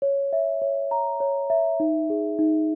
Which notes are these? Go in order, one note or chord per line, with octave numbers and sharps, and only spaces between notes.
C#5
E5
C#5
A#5
C#5
E5
D#4
G#4
D#4